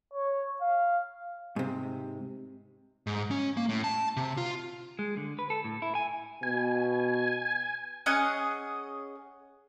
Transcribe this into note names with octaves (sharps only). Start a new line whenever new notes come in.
C#5
F5
G#2 C3
G#2
C#4
A#3
A2
A5
C3
F4
G#3
D3
B4
A4
A2
E4
G#5
B2 G#5
C#4 G#4 D#5 F#5